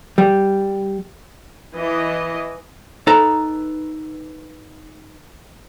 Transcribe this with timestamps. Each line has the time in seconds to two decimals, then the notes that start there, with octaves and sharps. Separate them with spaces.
0.18 G3
1.74 E3 D#5
3.07 D#4 A4 B4 A#5